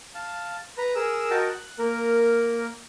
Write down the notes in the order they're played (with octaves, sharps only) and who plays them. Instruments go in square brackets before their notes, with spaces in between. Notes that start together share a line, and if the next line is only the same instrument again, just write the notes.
[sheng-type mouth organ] F5 A5
B4 A#5
G#4 A#4 E6
F#4 A#4 D#5 G5 A5
F#6
A#3 A#4